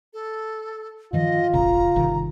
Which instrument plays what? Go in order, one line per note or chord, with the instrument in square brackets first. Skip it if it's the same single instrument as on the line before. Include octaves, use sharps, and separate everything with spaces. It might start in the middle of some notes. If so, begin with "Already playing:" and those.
[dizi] A4
[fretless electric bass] G2 D#3 F3 [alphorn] F4 [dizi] D#5
[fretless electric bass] E1 A1 C#3 [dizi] A#5
[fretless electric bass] G1 C3 D#3